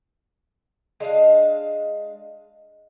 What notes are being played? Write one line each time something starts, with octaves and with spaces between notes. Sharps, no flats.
G#3 D4 D#5 F5